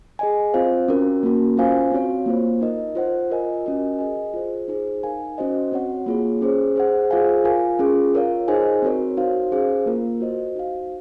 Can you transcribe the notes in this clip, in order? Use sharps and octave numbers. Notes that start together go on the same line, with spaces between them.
G#4 D#5 G#5
C4 F4 C5 F5
C#4 F#4 A#4
A#3 C#4 F#4 A#4
C#4 F4 C5 F5 G#5
C4 F#4 C#5 F5
A#3 F4 C5
D#4 A#4 D#5
F4 C5 F#5
F4 A#4 D#5 G#5
C#4 F#4 A#4 D#5 G#5
G#4 D#5 G#5
F4 G#4 C5
D#4 G#4 C5
D#4 A#4 F5 G#5
C#4 F#4 C5 D#5
C4 F#4 C#5 F#5
A#3 F4 G#4 C#5
C#4 G#4 C5
G#4 C5 F#5
F4 G#4 C5 F5 G#5
F4 A#4 F5 G#5
C#4 F4 G#4
F4 A#4 C#5 F5
D#4 G#4 C5 D#5 G#5
C4 F#4 A#4 C#5
D#4 F#4 C5 F5
C#4 G#4 C5 F5
A#3 F4 A#4
F#4 C5 D#5
D#4 F#4 C5 F5